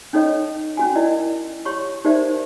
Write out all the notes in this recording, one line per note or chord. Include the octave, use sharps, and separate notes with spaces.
C#4 D#4 A4 C#5 D#5
C#4 F#4 G#5
E4 A#4 D5 D#5
G4 C#5 C6 C#6
D#4 G4 A#4 C5 D5 E5